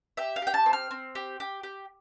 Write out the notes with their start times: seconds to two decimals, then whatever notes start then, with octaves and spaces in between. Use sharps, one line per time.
0.17 G4 E5
0.36 F5
0.42 G4 G5
0.54 A5
0.66 C4
0.73 F6
0.91 C4
1.15 G4
1.40 G4
1.63 G4